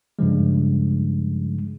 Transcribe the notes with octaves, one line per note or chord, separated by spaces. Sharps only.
G2 C#3 F3 G#3